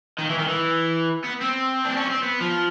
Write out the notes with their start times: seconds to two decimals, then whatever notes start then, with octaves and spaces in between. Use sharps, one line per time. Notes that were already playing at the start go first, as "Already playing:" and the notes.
0.19 D#3
0.30 E3
0.39 D#3
0.48 E3
1.24 B3
1.41 C4
1.85 D4
1.97 C#4
2.10 C4
2.23 B3
2.40 F3